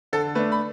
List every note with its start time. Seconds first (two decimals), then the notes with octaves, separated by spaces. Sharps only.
0.13 D3 A4
0.35 A3 B4
0.39 D4
0.52 B5